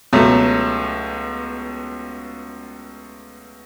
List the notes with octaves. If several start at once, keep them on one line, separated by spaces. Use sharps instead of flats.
C#2 B2 F#3 A3